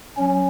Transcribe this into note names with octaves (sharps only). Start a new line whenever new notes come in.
F#3 C#4